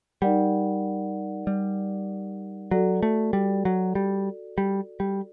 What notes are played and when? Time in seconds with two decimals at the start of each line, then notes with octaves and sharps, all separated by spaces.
0.22 G3 D#4 G4 A#4 D5 F#5
1.47 G3
2.71 F#3 F#4 A4 D5
3.03 A3
3.33 G3
3.65 F#3
3.95 G3
4.58 G3
5.00 G3